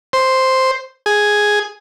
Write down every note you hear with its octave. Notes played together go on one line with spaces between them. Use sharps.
C5
G#4